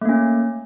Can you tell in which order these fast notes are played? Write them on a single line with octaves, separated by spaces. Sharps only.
A3 A#3 C#4